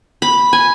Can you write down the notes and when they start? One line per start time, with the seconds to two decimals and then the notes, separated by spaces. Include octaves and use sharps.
0.22 B5
0.53 G#5